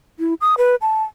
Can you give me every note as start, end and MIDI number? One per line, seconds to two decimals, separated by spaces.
0.19 0.34 64
0.41 0.55 87
0.58 0.75 71
0.81 1.03 81